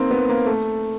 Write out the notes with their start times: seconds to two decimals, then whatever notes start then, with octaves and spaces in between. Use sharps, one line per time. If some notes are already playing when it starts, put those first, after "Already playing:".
Already playing: A#3 C4 D#4
0.11 B3
0.29 A#3
0.46 A3